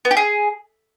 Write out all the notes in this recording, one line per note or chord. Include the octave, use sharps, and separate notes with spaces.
B3
G4
G#4